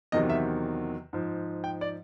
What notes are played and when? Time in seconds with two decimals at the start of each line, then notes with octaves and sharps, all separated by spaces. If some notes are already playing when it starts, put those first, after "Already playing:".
0.12 E2 C3 D#3 F#3 D#5
0.30 E5
1.13 G#2 F3
1.64 G5
1.81 D5